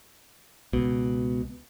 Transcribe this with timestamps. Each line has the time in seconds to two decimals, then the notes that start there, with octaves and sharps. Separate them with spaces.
0.73 C#2 B2